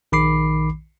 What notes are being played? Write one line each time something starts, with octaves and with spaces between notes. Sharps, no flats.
A#1 D#3 B5 D6 C7